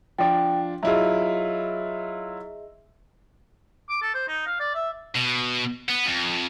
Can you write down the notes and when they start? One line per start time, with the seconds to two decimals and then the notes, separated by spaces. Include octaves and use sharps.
0.18 F3 D4 G5
0.83 F#3 E4 F4 G#4 D#5 E5
3.89 D6
4.02 A4
4.14 C5
4.28 D#4
4.46 F5
4.60 D5
4.74 E5
5.16 B2
5.89 B3
6.06 F2